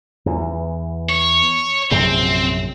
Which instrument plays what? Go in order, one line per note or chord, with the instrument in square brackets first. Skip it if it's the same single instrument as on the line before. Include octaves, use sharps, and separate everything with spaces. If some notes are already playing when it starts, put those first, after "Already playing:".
[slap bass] E2 E3
[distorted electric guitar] C#5
[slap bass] A#1 F#2 C3 [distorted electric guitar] C4